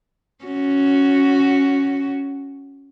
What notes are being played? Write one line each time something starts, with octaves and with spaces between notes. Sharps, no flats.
C#4 F#4